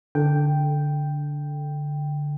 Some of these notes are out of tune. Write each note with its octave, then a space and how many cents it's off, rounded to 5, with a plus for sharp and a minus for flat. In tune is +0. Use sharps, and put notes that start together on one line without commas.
D3 -5 A4 +0 G5 +0